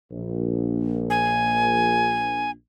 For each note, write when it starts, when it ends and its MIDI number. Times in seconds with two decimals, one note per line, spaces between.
0.11 2.53 34
1.10 2.50 80